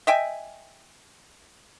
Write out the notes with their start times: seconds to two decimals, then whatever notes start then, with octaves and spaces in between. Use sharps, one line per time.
0.07 D#5 E5 G5 G#5